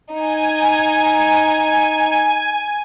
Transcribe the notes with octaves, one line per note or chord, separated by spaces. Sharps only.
D#4 G#5